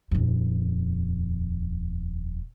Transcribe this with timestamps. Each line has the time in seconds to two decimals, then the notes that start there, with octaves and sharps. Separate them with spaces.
0.11 D#1 F2